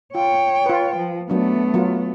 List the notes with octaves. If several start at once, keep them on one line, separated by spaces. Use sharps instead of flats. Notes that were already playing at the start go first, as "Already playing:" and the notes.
F4 C#5 G5
F4 B4
F3
F#3 A3 B3 D4
F#3 F4